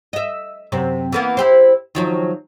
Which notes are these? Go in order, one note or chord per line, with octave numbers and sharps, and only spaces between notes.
D#5 E5
F#2 C3 C4
E3 A#3 B3
E4 G4 C5
D#3 F3 F#3